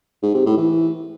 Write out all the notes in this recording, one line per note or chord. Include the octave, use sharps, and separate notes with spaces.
G#2
C3
A2
E3